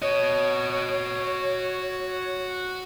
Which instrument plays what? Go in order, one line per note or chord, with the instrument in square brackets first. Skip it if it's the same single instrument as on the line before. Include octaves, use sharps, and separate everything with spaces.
[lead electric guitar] F#4 D#5 [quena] C#5